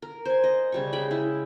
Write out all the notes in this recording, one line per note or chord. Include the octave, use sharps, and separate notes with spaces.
A#4
C5 G#5
D#5
C#3 G3 C#6
G#3 G5 B5
E4